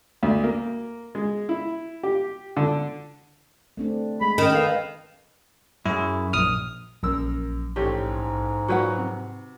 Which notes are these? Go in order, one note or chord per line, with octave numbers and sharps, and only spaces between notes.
D2
A#3
G#3
E4
G4
D3
A3 C4 D4
G#3 B5
D#3 C#4
A4 B4 F5
F#2 E4 G#4
A#1 D#6 F6
A#1 F#2 A#4 E6
A1 G#2 G4 C#5
A#2 F3 F#3 F#4 B4 F#5
C3